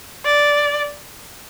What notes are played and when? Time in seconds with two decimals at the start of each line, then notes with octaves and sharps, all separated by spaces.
0.25 D5